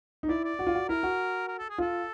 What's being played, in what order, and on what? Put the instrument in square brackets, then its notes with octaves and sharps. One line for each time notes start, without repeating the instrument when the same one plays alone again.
[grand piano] D#4
[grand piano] E4 [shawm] D5
[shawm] D5
[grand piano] F#4
F4
F#4
[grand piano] E4 [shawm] A#4
[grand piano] F#4
[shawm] A#4
A4
G#4
[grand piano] F4 [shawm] A4